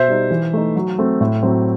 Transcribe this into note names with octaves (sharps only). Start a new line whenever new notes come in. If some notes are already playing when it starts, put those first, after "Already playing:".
Already playing: B2 C5 E5
G3 D#4
E3
A3 D#4
F#3
A3 C4
A2
F#3 C4